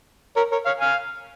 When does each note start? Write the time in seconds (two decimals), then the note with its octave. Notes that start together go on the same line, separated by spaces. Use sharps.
0.37 A#4 C#5
0.52 A#4 C#5
0.66 C#5 F5
0.80 F5 G#5